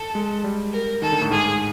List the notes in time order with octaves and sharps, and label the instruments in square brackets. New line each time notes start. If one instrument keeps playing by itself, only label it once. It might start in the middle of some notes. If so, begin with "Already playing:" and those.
Already playing: [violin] A4
[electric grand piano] G#3
G3
[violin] A#4
[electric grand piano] D#3 [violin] A4
[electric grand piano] D3
A2
[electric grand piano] G#2 [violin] G#4